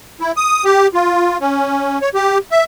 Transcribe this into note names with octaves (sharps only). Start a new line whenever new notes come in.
E4
D#6
G4
F4
C#4
C#5
G4
E5